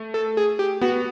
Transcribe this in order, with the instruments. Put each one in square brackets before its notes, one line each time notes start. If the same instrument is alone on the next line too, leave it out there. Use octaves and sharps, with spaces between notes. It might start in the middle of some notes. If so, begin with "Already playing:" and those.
Already playing: [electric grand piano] A3
[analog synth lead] A4
G#4
G4
[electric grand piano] B3 [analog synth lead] F#4